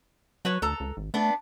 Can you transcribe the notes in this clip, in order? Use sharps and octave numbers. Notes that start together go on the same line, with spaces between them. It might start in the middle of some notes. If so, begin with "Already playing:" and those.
F#3 F#4 B4 C#5
D2 A4 A#5
C#2
G#1
A3 B3 D4